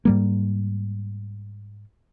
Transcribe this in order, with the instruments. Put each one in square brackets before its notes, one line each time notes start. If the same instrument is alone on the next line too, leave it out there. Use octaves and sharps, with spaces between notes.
[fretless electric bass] G#2 G3 A#3